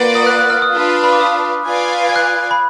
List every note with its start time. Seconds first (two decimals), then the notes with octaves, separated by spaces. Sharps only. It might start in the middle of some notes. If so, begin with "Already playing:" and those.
Already playing: A#3 F4 B4 D5 F#5
0.15 D#6
0.26 F#6
0.39 F#6
0.50 F6
0.62 D#6
0.74 D4 F4 B4 F5
1.04 B5
1.13 D6
1.21 D#6
1.68 F4 B4 D5 F5 G#5
2.09 G#6
2.16 F#6
2.51 B5